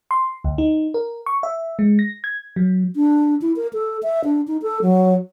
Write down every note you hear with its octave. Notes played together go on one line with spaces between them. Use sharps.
C6
D2
D#4
A#4
C#6
E5
G#3
A#6
G#6
F#3
D4
E4
A#4
A4
E5
D4
D#4
A4
F#3